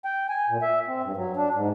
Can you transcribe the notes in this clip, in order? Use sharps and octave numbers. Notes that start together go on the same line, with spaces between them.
G5
G#5
A#2
E5
C4
G2
F#3
D4
G#2